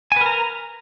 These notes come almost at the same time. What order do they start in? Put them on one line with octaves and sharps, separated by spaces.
G#5 B4 A#4 A#5